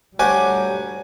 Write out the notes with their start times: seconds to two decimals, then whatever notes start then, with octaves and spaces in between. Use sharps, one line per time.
0.19 D2 F#3 G3 F#4 G4 G#5